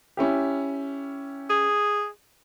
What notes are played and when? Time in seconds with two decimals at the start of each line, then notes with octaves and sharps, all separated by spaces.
0.17 C#4 E4 G4
1.49 G#4